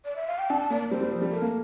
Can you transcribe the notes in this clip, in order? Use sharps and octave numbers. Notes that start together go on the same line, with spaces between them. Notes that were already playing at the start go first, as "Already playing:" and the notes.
D5
E5
F5
G5
D4 A5
A#3 D5
G3 C5
G3
F3
G3
A3 A#4
A#3